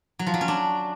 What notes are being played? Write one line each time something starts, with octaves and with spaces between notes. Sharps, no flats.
F#3
F3
F#3
C#4
D4